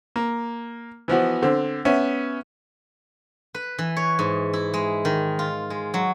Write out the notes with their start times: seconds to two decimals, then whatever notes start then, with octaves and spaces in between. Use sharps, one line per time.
0.16 A#3
1.08 E3 F3 B3 F#4
1.43 D3 C4
1.85 B3 C#4 E5
3.55 B4
3.79 E3
3.96 C#5
4.19 G#2
4.53 E4
4.74 G#3
5.05 D#3
5.39 F4
5.70 G#3
5.94 F#3